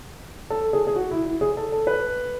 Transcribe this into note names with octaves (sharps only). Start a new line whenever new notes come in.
A4
G#4
G#4
F#4
E4
E4
G#4
A4
A4
B4